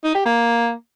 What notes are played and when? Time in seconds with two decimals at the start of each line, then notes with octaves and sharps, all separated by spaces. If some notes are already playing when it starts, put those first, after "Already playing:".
0.04 D#4
0.15 G4
0.26 A#3